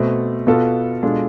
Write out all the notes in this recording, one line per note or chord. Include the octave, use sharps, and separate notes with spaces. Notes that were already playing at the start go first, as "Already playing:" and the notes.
Already playing: B2 A3 C4
B2 B3 F4 A4
B2 G#3 D4 F4 A4